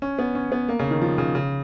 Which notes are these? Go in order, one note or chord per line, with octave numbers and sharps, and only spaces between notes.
C#4
B3
C#4
B3
A#3
C#3
D#3
F3
C#3
C#3